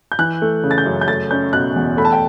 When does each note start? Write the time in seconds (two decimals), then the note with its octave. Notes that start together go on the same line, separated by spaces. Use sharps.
0.12 G6
0.19 E3 F#6
0.42 A3
0.64 C#3
0.71 A6
0.78 G6
0.86 F#2
1.01 G6
1.08 A3 A6
1.31 C#4 G6
1.53 B2 F#6
1.76 E2
1.97 A3 B5
2.05 A5
2.12 G5